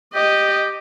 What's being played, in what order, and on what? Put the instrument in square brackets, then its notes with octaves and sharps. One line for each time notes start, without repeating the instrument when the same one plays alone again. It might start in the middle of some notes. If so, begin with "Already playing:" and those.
[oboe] G4 [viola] D#5